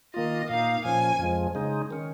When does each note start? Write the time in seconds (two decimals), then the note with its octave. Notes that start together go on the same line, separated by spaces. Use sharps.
0.14 D#3 A#3 F4 D#5
0.49 A#2 A#3 D#4 F5
0.85 A#2 F3 C#4 G#5
1.19 F2 F3 G#3
1.55 C#3 G#3 D#4
1.91 D#3 C#4